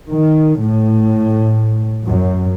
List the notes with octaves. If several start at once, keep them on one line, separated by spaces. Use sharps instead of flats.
D#3
A2
F#2